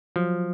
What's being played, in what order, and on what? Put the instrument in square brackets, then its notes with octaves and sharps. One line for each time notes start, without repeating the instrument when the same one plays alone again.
[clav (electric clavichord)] F3 [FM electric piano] F#3